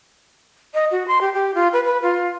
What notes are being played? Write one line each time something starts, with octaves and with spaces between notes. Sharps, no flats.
D#5
F#4
C6
G4
G4
F4
B4
B4
F4